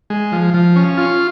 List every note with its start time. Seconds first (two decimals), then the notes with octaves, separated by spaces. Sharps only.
0.10 G#3
0.32 F3
0.54 F3
0.76 C#4
0.98 F4